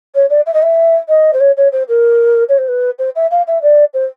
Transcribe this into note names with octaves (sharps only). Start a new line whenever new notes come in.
C#5
D5
E5
D#5
E5
D#5
C5
C#5
C#5
C5
A#4
C#5
C5
B4
C5
E5
F5
E5
D5
C5